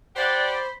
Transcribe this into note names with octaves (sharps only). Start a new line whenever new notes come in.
G4 C5 D5 F#5 B5